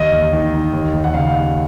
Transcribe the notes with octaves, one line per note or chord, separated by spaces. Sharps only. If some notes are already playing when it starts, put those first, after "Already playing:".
Already playing: D#2 D#5
D#2
D#3
D#3
D#2
D#2
F#5
C#3 F5
D#2